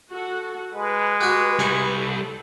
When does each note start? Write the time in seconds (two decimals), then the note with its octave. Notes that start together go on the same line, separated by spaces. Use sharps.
0.10 F#4 A4 F#5
0.74 G#3 B4
1.21 F#4 G4
1.59 C2 G3 G#5 C#6
1.98 A4